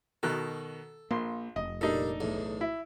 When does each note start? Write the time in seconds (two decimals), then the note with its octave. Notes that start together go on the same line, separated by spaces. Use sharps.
0.23 B2 D#3 A4 F#6
1.11 A#1 A#3 C6
1.56 F1 D#5
1.81 A#2 G3 D4 D#4 A4
2.20 B1 E2 A2
2.61 E4